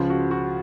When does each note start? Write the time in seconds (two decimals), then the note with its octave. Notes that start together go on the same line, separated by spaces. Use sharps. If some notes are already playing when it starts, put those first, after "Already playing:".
Already playing: C#2 C#3 F3 F4
0.10 F#4
0.31 F#4